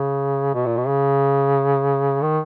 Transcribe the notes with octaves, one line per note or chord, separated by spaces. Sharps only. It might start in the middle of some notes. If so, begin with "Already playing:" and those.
Already playing: C#3
B2
A#2
B2
C#3
D#3